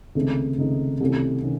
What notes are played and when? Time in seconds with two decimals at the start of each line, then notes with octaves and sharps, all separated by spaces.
0.15 C#2 C3 D#3 A3 D#4
0.58 C#2 C3 D#3 A3 D#4
1.00 C2 C3 D#3 A3 C#4
1.43 C3 D#3 C#4